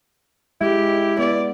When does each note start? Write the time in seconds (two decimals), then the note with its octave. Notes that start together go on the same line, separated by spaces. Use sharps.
0.61 G#3 E4 G4
1.19 B3 D5